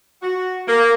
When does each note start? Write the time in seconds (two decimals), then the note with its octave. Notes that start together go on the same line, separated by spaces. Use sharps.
0.22 F#4
0.67 A#3